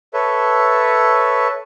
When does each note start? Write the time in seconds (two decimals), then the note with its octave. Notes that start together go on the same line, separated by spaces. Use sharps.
0.14 A4 B4 C#5 E5